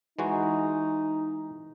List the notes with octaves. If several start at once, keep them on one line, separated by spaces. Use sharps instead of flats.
E3 G#3 D#4 F#4